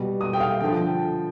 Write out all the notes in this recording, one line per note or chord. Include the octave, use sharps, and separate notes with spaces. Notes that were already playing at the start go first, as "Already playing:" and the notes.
Already playing: B2 G3
D#6
G5
F5
D3 F3 G5